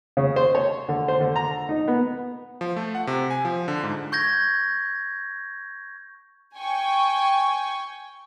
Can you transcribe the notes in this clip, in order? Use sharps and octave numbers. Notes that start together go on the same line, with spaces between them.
C#3
C5
C#5
D3
C5
D3
A#5
D#4
B3
F3
A3
F#5
C3
G#5
F3
D3
G#2
C#6 G6 G#6 A#6
G5 G#5 C#6